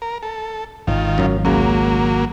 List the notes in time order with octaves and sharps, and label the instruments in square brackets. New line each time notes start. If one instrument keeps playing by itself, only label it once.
[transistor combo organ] A#4
A4
[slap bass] D#1 G#1 [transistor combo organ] D#3 F4
[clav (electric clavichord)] F#2 F#3
[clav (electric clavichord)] C#2 C#3 [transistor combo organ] F#3 A#3